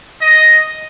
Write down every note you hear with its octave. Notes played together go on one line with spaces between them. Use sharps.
D#5